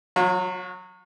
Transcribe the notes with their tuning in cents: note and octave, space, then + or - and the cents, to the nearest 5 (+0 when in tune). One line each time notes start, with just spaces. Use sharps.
F#3 -15 F4 +45